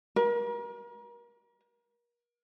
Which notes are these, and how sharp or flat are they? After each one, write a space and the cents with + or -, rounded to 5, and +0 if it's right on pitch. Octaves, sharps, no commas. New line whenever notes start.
A#4 +35